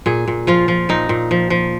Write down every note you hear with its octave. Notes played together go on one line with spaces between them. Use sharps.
A#2 G#4
A#2
F3 F4
F3
A#2 D#4
A#2
F3
F3